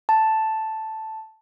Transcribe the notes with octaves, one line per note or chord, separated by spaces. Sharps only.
A5